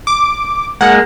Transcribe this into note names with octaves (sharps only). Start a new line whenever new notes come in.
D6
G#3 A#3 F#5